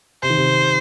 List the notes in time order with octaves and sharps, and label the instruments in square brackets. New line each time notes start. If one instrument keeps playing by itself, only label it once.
[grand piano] C3 [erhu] C5
[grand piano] D#3
C3